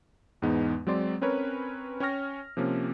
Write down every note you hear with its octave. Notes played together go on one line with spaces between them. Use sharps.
E2 G#2 G#3 B3 D#4
F#3 G#3 C4 D5 C6
C4 C#4 A#4 B4 C#5
C#4 C#5 G5 C#6 F6 A#6
C3 F3 A#3 C#4